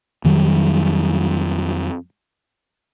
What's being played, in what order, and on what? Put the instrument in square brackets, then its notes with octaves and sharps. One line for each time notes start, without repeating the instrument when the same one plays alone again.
[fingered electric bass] F2 D#3 F#3 G3